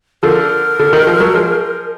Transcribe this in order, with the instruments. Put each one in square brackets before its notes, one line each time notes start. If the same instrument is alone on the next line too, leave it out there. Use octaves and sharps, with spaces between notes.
[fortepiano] D3 F3 [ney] A#4
[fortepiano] D3
D#3
F3
F#3
F3 G#3